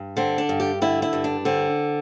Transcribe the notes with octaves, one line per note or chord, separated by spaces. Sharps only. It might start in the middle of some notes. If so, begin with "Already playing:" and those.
Already playing: G2
D3 C4
D4
G2
G4
D3 E4
E4
G2
D4
D3 C4